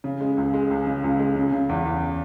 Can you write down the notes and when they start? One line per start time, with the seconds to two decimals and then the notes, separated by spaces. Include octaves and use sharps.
0.04 C#3
0.21 G#3
0.37 C#2
0.54 G#3
0.71 C#2
0.87 C#3
1.04 C#2
1.19 G#3
1.36 C#3
1.52 C#3
1.69 E2
1.85 E2